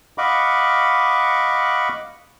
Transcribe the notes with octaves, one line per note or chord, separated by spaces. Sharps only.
D#5 F5 F#5 B5 C#6 D6